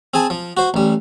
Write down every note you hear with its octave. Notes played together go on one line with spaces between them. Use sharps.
C4 G#4 G#5 A5
F3
F#4 C5
A1 G3